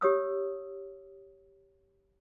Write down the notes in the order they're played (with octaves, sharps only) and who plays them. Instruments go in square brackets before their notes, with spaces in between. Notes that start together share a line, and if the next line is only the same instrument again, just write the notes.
[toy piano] G4 C#5 D#6 E6